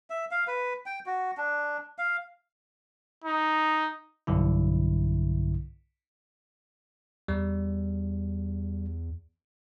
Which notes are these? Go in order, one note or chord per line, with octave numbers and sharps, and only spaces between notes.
E5
F5
B4
G5
F#4
D4
F5
D#4
B1 G2 D3 E4
E2 G3